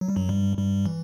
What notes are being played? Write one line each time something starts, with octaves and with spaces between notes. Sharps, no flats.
F#3
G3
F#2 F#3
G2 G3
G2 G3
E3